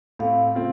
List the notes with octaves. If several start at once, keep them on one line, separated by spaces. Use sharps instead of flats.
A2 A3 C4 F5
C#3 A3 C4 F4